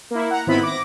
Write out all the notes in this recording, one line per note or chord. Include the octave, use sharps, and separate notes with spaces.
A#3 E4
F#5 A#5
G#1 D#3 B3 C4 E4 B5
D6 A#6